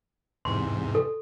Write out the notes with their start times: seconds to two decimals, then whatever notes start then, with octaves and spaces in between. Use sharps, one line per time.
0.45 E2 G#2 C3 C6
0.95 A4